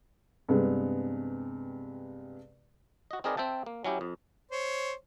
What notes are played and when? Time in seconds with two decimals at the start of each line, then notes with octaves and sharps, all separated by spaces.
0.49 G2 C3 G#3 B3
3.11 F#4 D#5
3.24 C4 D#4 G#4 A#4 B4 D5
3.37 C4 E5 G5 A5
3.66 A#3
3.84 F#3 C#4 E4 G4
4.01 F2
4.51 C5 C#5